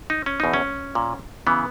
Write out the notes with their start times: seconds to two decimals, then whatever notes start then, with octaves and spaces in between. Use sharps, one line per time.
0.10 D#4
0.26 C#4
0.40 E2 B2 D#4
0.53 C#4
0.95 A#2
1.47 C#3 E3 B3